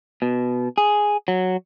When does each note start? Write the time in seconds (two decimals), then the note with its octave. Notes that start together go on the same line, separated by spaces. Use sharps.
0.22 B2
0.78 G#4
1.28 F#3